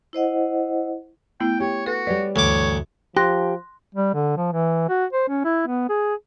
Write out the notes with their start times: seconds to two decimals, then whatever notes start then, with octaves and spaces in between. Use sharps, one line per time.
0.13 E4 C5 D#5 F#5
1.40 A3 B3 E4 G5
1.60 G4 C#5
1.86 F#4 A4 B4
2.07 G3 B4 C#5 D5
2.36 D2 G2 E3 C#5 D6
3.17 F3 G4 C6 F#6 A#6
3.95 G3
4.14 D3
4.37 F3
4.53 E3
4.89 F#4
5.13 C5
5.29 C#4
5.44 E4
5.67 B3
5.89 G#4